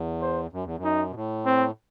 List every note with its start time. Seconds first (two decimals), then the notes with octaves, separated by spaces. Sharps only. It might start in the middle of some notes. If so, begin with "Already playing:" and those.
Already playing: E2
0.22 C5
0.53 F#2
0.64 E2
0.77 F#2
0.84 D#4
1.10 B2
1.15 A2
1.46 C4